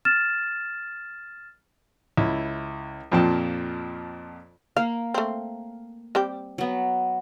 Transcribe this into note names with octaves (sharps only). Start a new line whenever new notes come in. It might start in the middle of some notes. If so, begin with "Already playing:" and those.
F6 A6 E7
C#2 E4
F2 A#2 F3 G5 A5
A#3 F5
A3 C4
G3 C4 G4
F#3 B3